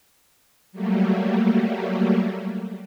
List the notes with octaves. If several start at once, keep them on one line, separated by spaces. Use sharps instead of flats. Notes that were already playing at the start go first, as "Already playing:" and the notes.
F#3 G3 A3 A#3